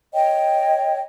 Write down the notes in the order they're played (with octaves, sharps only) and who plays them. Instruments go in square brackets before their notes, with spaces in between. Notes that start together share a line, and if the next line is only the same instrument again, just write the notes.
[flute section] C#5 D#5 G5